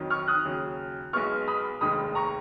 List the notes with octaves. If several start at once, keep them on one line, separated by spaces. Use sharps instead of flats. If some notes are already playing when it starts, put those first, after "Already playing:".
Already playing: F2 D#3 F#3
C#6 F6
D#6 F#6
D#2 C#3 F#3
B1 B2 G#3 B3 C#6 F6
B5 D#6
F1 D#2 D#3 G#3 B5 D#6
A#5 C#6